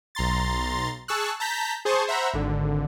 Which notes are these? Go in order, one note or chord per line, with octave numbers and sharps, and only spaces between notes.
B1 A#5 C6 A6
G#4 A5 C#6 E6 F#6
A5 A#5 G6 B6
G#4 C5 A5 C6 C#6 D#6
C5 E5 F#5 A#5 B5
G#1 D3